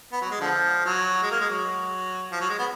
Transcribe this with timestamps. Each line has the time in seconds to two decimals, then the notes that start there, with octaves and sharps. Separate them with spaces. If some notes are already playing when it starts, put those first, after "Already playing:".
0.12 B3
0.22 F#3
0.31 G#3
0.40 D3 F3
0.86 F#3
1.22 G#3
1.31 A#3
1.40 G#3
1.50 F#3
2.32 F3
2.40 F#3
2.50 G#3
2.59 B3